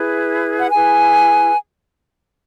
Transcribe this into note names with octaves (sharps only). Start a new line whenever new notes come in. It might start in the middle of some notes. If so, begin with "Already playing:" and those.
Already playing: E4 G#4 B4
F#5
E4 G#4 B4 G#5